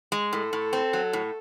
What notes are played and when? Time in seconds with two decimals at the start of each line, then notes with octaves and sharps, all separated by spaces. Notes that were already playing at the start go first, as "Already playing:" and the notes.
0.12 G#3
0.32 A2 A4
0.53 A2
0.73 C4
0.93 F#3
1.13 A2